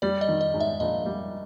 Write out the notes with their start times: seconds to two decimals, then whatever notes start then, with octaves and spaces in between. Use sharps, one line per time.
0.02 G3 D5
0.21 D#5
0.28 D#3
0.41 D#5
0.54 G#2
0.60 E5
0.80 A#1 D#5
1.06 G3